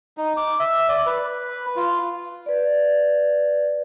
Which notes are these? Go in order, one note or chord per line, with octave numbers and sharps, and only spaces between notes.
D#4
D6
E5
D5
B4
F4
B4 D5